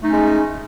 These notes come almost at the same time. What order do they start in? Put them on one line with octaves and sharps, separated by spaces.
A3 D#4 C#4 G#3